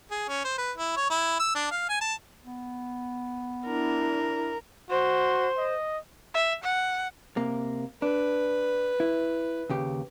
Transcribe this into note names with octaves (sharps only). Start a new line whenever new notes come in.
G#4
C#4
C5
B4
E4
C#5
E4
E6
D4
F5
G#5
A5
B3
D4 E4 A#4
F#4 C5 C6
D#5
E5
F#5
C3 A#3
D4 B4
E4
D#2 C#3 G4